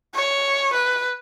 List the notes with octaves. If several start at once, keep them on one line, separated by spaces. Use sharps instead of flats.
C#5
B4